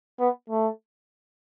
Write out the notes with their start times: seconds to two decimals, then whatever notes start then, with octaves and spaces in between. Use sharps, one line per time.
0.20 B3
0.50 A3